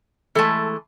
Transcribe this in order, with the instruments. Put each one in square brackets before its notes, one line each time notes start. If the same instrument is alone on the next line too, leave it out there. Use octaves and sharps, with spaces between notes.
[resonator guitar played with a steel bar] E3 G#3 A3 [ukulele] A4 A5